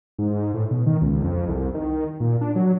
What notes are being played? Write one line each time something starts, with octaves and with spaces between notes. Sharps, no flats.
G#2
A2
B2
D#3
C#2
F2
C2
D#3
A#2
D4
F#3